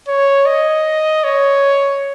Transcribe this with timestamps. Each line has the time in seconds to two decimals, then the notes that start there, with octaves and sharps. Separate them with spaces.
0.08 C#5
0.46 D#5
1.24 C#5